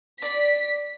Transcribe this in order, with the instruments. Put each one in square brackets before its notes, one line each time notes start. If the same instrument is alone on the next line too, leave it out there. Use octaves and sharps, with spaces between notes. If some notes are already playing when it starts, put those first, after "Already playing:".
[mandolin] D5 [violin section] B6